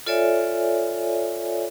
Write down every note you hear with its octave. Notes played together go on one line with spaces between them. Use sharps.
F4 A4 C#5 D5 E5 G#5